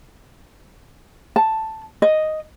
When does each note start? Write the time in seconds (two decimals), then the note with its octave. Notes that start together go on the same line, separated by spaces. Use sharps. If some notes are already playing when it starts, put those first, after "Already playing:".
1.36 A5
2.02 D#5